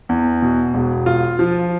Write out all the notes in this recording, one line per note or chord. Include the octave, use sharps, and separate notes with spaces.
E2
B2
E1
F4
F3